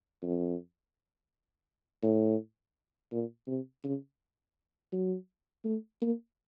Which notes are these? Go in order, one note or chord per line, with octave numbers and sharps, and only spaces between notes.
F2
A2
A#2
C3
C#3
F#3
A3
A#3